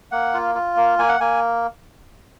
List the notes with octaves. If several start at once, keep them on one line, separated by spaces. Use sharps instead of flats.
A#3 F#5
F4
F4
A#3
A#3 G#5
F#5
A#3 G#5